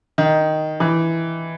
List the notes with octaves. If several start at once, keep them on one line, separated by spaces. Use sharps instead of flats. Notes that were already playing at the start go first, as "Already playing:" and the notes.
D#3
E3